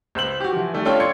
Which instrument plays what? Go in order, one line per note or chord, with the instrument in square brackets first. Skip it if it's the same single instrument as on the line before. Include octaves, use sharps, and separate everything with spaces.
[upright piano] C#2 C5 E6 F#7
F#4 G4
E3 F3
D#3 G3 A3
C#4 D4 F4 A4 C#5 G5
D5 C6 C#6 G#6 C#7